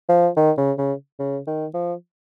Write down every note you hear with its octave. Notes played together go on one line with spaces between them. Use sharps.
F3
D#3
C#3
C#3
C#3
D#3
F3